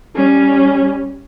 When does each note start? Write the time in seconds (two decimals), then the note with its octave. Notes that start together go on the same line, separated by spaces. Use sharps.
0.16 G3 C#4